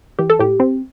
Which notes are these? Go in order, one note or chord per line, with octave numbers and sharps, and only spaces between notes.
E3 G4
A4
A2 G4
C4